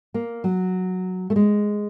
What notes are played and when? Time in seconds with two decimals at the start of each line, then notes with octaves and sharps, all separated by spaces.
0.14 A#3
0.44 F#3
1.30 A3
1.36 G#3